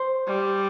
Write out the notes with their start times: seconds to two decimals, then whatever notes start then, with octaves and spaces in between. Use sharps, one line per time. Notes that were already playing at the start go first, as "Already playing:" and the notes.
Already playing: C5
0.27 G3